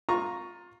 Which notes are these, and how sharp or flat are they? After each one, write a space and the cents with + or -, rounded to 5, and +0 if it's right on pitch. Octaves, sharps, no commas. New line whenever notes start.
F4 +20 A#5 +0 C#6 +0